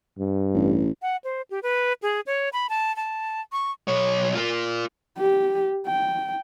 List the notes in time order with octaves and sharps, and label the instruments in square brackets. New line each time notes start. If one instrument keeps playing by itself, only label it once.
[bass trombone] G2
[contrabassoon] A1
[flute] F#5
C5
G4
B4
G#4
C#5
B5
A5
A5
C#6
[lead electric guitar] B1 C#5
F4 A#4
[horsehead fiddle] G4
G5